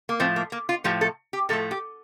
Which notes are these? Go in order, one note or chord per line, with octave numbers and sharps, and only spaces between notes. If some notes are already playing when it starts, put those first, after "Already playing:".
A#3
A2 F3 A3 C4
A#3
A#3
F4
A2 F3 A3 G4
A4
G4
A2 F3 A3 A4
G4